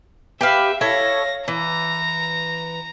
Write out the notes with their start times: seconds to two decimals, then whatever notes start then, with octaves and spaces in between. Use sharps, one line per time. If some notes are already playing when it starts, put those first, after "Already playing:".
0.41 G4 B4 E5 F5
0.81 E4 A4 C#5 F5 A#6
1.48 E3 A#5